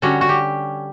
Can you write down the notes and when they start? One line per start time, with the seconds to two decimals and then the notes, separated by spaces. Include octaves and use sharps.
0.02 D3 G3 C#4 F#4
0.21 F#4
0.29 G4